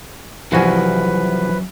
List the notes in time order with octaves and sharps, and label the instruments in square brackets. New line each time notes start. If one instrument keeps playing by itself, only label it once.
[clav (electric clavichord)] C2 F#4 G#5 [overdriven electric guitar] F#2 [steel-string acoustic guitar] E3 F3 [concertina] B4